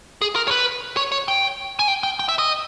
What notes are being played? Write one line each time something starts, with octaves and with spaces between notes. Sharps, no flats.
G#4
A#4
C#5
B4
C#5
C#5
G5
G#5
G5
G5
G5
E5
D#5